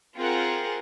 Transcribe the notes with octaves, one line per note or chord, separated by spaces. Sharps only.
C4 F4 G#4 A#4 F#5